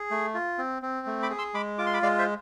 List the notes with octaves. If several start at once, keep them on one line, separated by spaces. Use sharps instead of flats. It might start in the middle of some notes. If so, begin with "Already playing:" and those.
Already playing: G#4
A3
F4
C4
C4
A3
B5 D6
G#4
C6 E6
G#3 B5 D6
F4 D6
C6
B5 D6
G#3 D5 F5
C5 E5